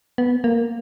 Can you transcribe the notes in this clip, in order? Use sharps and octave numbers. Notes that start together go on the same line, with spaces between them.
B3
A#3